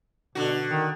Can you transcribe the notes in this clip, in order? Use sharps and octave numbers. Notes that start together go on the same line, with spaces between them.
B2 D3 F#4
D#3